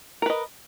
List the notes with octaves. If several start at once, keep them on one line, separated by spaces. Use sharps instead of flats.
A#4 B4 D#5